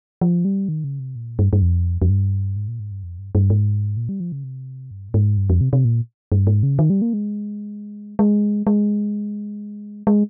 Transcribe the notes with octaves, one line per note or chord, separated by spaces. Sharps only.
F3
G3
D#3
C#3
C3
A#2
G2
G2
F2
F2
G2
G#2
A#2
G#2
G2
F2
G2
G2
G#2
A#2
G3
F3
C#3
C3
G2
A#2
G#2
G2
F2
C3
C3
A#2
G2
G#2
C#3
D#3
G3
A#3
G#3
G#3
G#3
G#3